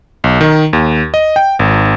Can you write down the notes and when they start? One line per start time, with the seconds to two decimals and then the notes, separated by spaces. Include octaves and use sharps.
0.24 B1
0.41 D#3
0.73 D#2
1.14 D#5
1.36 G5
1.59 G#1